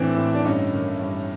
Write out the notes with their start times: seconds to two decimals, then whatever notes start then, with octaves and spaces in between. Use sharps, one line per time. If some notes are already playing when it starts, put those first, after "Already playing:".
Already playing: A2 E3 C4 D4
0.16 A2
0.34 D4
0.44 G2 C#4 D#4
0.73 D#3
1.02 G2